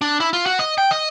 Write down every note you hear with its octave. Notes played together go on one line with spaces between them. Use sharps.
D4
E4
F4
F#4
D#5
G5
D#5